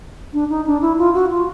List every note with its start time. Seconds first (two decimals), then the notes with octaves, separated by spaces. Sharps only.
0.33 D4
0.50 D#4
0.66 D4
0.81 E4
0.98 F4
1.14 F#4
1.30 F4